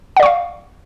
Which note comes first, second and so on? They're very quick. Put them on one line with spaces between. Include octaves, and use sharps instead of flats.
F#5 D5 C#6 F5